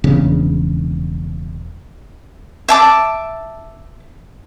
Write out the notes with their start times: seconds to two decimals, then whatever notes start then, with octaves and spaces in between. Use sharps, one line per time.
0.04 E1 A#1 E2 C#3
2.68 E5 A5 D6